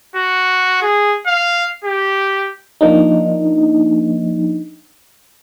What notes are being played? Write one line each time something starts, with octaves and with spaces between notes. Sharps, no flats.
F#4
G#4
F5
G4
F3 A#3 D4 D#4